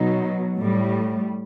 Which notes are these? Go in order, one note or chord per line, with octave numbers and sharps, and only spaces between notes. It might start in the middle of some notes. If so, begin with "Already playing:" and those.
Already playing: B2 F#3 D#4
A2 G3